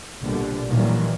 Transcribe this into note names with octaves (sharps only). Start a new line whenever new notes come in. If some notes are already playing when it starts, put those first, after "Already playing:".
A#1 B2 D3 G3
A#2 D#3 E3 F#3 G3